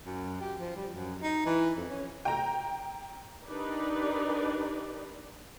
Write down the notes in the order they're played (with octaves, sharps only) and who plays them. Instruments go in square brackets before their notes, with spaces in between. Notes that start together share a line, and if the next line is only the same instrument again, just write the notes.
[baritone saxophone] F#2
G4
F3
G3
F#2
D#4
E3
F2
C#4
[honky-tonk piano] G5 A#5
[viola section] D4 D#4 G4 A#4 B4 D5